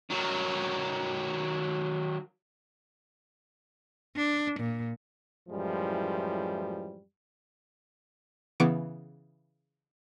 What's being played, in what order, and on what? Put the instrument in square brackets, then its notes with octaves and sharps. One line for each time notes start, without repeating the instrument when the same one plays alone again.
[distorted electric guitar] D#3 F#3
[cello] D4
A#2
[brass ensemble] F#2 A2 E3 F3 G3 G#3
[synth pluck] C#3 E3 B3 C#6 D6 D7